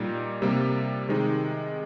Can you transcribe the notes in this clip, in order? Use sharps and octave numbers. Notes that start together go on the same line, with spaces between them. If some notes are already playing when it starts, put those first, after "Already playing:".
Already playing: A#2 G3 A#3 D#4
C3 G3 A#3
C3 D#3 G#3 D#4